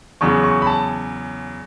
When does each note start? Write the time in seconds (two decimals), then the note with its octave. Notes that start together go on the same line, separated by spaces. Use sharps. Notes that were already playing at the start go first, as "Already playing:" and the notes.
0.21 E2 C#3 F#3 C#6
0.44 C#6
0.62 B5
0.67 A5